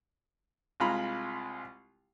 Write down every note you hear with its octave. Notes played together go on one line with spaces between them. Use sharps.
C2 G#3 F4 A#5 B5